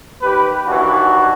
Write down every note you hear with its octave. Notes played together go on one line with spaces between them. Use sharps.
D#2 G4 B4
D#2 E3 D4 F#4